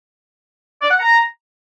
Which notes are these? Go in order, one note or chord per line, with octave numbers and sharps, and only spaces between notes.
D5
F#5
A#5